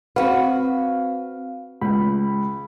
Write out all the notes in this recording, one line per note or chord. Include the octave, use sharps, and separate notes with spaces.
C4 F#4 B4 F5 F#5
C#2 B5